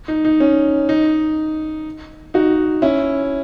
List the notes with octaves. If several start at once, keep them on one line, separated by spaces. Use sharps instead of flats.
D#4
D#4
C#4
D#4
D#4 F#4
C#4 E4